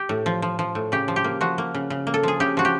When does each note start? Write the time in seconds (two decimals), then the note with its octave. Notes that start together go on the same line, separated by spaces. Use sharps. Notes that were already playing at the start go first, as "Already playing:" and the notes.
Already playing: G4
0.09 A2
0.26 F3
0.42 F3
0.59 F3
0.75 A2
0.92 C#3 G4
1.08 F3
1.16 G4
1.24 A#3
1.41 F3 F#4
1.58 A#3
1.74 C#3
1.90 C#3
2.07 A#3
2.14 A4
2.23 F3 G#4
2.40 C#3 G4
2.57 F3 F#4
2.65 G4